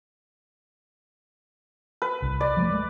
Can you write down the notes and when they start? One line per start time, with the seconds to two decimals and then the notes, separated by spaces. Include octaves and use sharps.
2.02 B4
2.22 C2
2.41 D5
2.57 F3 G#3 A3
2.72 G#3 A3